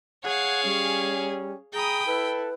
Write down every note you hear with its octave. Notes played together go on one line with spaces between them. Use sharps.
G#4 C#5 F5 F#5
G3 C#4
G#4 G5 A#5 B5 D#6
E4 A4 B4